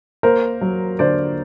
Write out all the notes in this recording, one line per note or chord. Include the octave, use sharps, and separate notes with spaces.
A#3 A#4 C5
F#3
D3 C5 D5